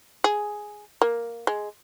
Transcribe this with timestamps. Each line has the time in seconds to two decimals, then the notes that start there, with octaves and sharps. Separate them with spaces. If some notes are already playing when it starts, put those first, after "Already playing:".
0.24 G#4
1.02 A#3
1.47 G#3